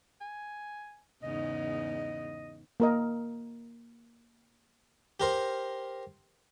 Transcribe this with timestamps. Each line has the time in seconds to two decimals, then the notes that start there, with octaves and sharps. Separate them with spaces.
0.21 G#5
1.23 E2 G#2 C#3 D#5
2.80 A#3 A#4 D#5
5.20 G4 A#4 C5